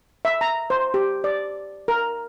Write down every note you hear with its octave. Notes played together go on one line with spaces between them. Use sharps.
E5
A#5
C5
G4
D5
A#4